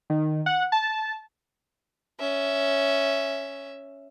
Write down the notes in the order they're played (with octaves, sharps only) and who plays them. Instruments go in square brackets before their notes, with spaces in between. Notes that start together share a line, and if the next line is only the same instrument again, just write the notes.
[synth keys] D#3
F#5
A5
[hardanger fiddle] C#4 E5